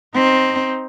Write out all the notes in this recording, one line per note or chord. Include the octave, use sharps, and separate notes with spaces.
C4 D#4